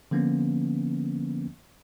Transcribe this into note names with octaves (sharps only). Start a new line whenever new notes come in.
D3 F3 A#3 B3 C#4